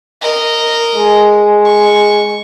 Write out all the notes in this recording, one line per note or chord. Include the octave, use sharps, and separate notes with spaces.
A#4 D#5
G#3
C#6